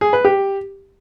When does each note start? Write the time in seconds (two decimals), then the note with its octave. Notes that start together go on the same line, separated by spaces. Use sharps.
0.01 G#4
0.13 B4
0.25 G4